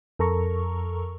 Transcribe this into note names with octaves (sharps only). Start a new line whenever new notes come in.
F2 A4 A#4 A#5 C#6